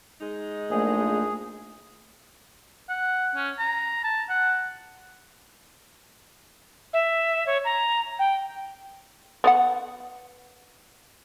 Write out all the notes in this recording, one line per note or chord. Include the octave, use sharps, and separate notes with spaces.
G#3 D#4
A#1 A3 A#3 G#4
F#5
C#4
A#5
A5
F#5
E5
C#5
A#5
G5
B3 D5 F#5